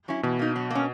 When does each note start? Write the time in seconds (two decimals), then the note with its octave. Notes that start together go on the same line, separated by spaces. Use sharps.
0.08 F#3 C#4 E4
0.23 B2 E3
0.39 A#3 D#4
0.56 F#3
0.70 A#3 C#4